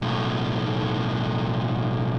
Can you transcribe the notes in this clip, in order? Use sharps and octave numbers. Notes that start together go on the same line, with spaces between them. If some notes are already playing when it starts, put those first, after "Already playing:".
B1 A2